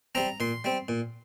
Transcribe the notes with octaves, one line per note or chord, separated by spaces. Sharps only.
G3 C4 A#5
A#2 C6
G3 C4
A#2